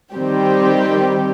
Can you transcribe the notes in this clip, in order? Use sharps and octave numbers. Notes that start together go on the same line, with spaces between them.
D#3 G3 C4 G4